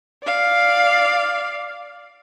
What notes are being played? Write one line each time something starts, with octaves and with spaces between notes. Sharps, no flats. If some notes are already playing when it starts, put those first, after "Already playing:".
D5 F5